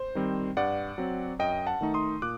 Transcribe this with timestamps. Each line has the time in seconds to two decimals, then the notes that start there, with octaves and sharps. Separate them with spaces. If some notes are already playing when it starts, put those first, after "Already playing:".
Already playing: C5
0.15 D#3 G3 C4
0.57 G2 D5 F#5
0.98 F#3 C4
1.39 F#2 D#5 G5
1.67 F#5 A5
1.81 D#3 A3 D#4
1.94 C6 D#6
2.22 A#2 D6 F#6